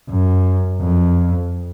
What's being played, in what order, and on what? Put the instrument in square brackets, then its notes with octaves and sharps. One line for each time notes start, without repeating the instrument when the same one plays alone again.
[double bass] F#2
F2